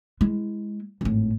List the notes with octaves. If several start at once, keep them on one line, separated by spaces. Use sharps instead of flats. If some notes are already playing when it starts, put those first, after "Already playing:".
G#3 E4
G#1 A2